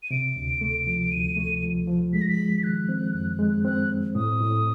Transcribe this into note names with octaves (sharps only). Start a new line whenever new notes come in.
D#7
C3 D7
D2
A3
F3
D2 D#7
A3
F3
F3
G#3 B6
A#6
B6
G#3
D#3 F#6
C4
F#2
G#3
C4 F#6
C4
A2 D#6
A2